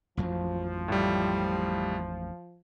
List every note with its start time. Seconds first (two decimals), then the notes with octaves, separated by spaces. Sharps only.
0.17 A1 F2 F3 F#3
0.88 A2 G3